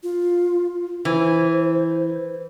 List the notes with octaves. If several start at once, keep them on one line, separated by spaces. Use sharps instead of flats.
F4
E3 C5